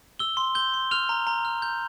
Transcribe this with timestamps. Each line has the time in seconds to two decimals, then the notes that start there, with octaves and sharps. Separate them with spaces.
0.19 E6 G7
0.37 C6
0.55 G6 G7
0.74 C6
0.91 F6 F7
1.09 A#5
1.27 A#5
1.45 F6
1.62 G6